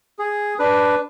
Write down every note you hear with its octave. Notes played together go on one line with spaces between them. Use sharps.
G#4
D4 B4